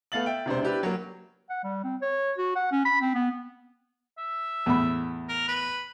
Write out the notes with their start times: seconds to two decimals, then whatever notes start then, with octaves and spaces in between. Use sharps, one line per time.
0.12 A3 B3 F5 A6 F#7
0.26 E5 G5
0.46 E1 C3 D4 C5
0.63 D4 E4 G4 B4 E5
0.83 F#3 A#3
1.50 F#5
1.64 G3
1.84 C4
2.02 C#5
2.38 F#4
2.56 F#5
2.72 C#4
2.85 B5
3.01 C4
3.15 B3
4.18 E5
4.66 E2 A2 B5
5.28 A#4
5.48 B4